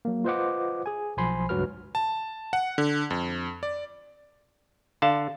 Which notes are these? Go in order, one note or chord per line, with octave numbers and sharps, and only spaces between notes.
F#3 A#3
F4 B4 C5 D#5 F#5 D6
G#4 G#5
B1 F3 C5 G#5 B5 C6
C#2 G2 F#3 F#4 B4 F6
A5
F#5
D3
F2
D5
D3 F5 A5